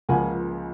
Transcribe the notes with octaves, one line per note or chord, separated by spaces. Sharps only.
C#2 C#3 F3 A#3 F#5 G#5